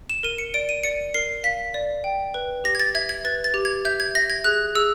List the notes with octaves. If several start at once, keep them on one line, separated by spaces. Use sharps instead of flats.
E7
A#4 D#7
C#7
D5 D7
D#7
D5 C#7
A#4 C7
F5 B6
D5
G5
B4
G4 A#6
G#6
A6
E5 G#6
G#6
B4 A6
A6
G4
G#6
E5 G6
G#6
E5 A#6
G#6
G#4 F#6
G#4 E6